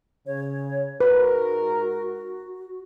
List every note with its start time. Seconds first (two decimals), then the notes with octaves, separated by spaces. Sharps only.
0.26 C#3 C#5
1.01 G#2 F#4 A#4 B4